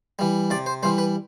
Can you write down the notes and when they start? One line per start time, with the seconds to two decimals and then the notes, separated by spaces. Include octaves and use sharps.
0.19 E3 G3
0.50 C3 D5
0.66 C5
0.83 E3 G3 C5
0.98 B4